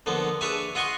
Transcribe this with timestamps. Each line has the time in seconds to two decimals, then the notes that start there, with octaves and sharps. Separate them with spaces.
0.06 D3 F3 A#3 B3
0.41 D4 G#4 B4 C#5 E5 G#5
0.75 F4 D#5 F#5 G#5 C6 C#6